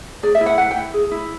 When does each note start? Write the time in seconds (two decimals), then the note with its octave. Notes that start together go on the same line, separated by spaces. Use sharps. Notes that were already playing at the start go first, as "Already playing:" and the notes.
0.23 G#4 D5
0.35 E5
0.41 E4
0.46 F#5
0.58 B4 F#5
0.71 G5
0.76 E4
0.94 G#4
1.12 E4